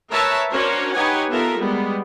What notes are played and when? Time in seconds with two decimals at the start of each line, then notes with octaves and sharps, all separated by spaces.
0.11 A#4 B4 C#5 E5 A5
0.51 C#4 D4 F#4 A#4 C5 C#5
0.93 D#4 G4 B4 C#5 F#5 G#5
1.30 B3 F4 A4 A#4 E5
1.59 G3 G#3 B3